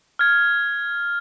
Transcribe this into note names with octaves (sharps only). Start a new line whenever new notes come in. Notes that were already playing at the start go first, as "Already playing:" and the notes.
F6 G#6